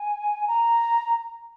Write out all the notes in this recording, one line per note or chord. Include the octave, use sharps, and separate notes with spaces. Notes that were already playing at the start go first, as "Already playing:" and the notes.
Already playing: G#5
A#5